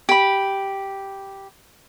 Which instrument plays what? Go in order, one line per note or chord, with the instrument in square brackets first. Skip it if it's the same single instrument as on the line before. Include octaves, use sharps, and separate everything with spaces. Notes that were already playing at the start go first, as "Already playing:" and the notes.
[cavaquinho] G4 B5